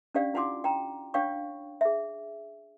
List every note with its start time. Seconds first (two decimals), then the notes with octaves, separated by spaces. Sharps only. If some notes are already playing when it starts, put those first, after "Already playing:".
0.14 C#4 D4 G4 D5 F5
0.34 E4 F4 F#5 G#5 C6 D6
0.64 G5 A#5
1.14 D4 C#5 F5 G5 C#6
1.81 G#4 E5